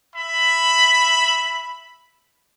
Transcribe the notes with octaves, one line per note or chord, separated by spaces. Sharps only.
E5 B5